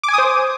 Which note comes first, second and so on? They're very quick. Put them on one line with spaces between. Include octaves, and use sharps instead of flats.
D6 G#5 D#6 C5